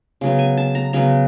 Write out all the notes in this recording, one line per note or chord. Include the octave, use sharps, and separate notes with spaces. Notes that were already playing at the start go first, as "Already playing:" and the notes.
C#3 F#3 B3
G#5
A5
A#5
C#3 F#3 B3 A#5